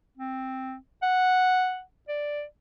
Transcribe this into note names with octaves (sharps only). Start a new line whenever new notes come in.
C4
F#5
D5